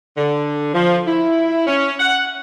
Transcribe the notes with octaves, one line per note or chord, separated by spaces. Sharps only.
D3
F3
E4
C#4
F#5